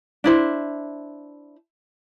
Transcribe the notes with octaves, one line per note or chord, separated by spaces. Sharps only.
D4 E4 C5